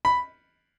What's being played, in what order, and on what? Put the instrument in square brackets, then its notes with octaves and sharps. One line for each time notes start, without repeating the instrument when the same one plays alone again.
[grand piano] B5